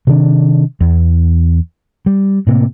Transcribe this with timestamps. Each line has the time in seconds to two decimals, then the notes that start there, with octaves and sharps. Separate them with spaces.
0.07 C3 D#3 D4
0.81 E2
2.06 G3
2.47 A2 C3 A#3